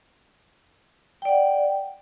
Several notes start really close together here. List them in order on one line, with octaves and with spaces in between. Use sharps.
G5 D5 F#5